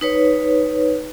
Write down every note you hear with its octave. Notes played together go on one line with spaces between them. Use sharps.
D#4 B4 C#5